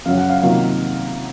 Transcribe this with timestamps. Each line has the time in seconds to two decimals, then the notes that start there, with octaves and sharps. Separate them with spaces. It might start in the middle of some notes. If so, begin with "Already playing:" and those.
0.06 F#2 C#3 F#3 C#4 F5
0.17 F#5
0.29 F5
0.42 C3 D#3 F#3 A#3 F4 F5